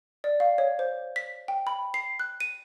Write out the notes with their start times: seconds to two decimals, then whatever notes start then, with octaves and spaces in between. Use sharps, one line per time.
0.24 D5
0.40 F5
0.58 C#5
0.79 C5
1.16 B6
1.48 G5
1.67 B5
1.94 C7
2.20 F#6
2.40 D#7